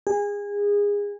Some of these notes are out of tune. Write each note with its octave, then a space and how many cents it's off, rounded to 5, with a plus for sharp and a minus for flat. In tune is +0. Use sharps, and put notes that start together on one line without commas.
G#4 -25